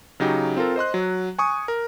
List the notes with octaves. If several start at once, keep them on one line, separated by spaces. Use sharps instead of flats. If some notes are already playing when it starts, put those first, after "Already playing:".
C#3 F#3 D#4 G4
C4 F4 A4 A#4
C5 D#5 C6 F#6
F#3
G#5 C#6 D#6
A#4